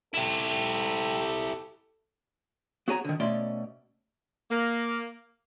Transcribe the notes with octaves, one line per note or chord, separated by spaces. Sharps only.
E4 G4 A4
B3 F#4 G#4 C#5 G#5 A#5
D3 D#3
B2 A3 C#4 D5 C6
A#3